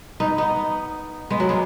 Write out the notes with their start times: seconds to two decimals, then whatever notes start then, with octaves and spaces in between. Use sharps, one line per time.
0.20 B3 D#4
0.38 B3 D#4
1.30 G#3 B3
1.40 F#3 A#3
1.49 G#3 B3